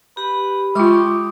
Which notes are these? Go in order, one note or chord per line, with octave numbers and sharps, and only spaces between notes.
G4 B4 B5
G#3 F4 G4 C6 C#6 D#6